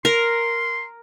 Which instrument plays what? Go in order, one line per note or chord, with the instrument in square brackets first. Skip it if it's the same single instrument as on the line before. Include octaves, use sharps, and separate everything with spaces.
[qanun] A#4 [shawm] C6